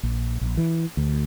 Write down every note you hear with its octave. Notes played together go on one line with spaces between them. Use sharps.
A#1
A#1
E3
D2